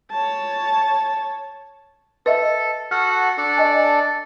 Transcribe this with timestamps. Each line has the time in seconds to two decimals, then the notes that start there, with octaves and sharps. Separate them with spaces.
0.11 C#5 A5
2.26 A4 B4 D#5 E5
2.91 F#4 A4 F#5 F6
3.38 D4 A4 D5
3.58 D#5 G#5